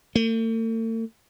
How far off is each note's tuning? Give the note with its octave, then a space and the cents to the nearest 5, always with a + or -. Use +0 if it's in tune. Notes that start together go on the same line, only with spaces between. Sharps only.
A3 +45